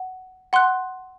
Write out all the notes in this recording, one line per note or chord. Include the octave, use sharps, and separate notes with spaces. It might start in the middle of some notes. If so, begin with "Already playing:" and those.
Already playing: F#5
F#5 C6 F#6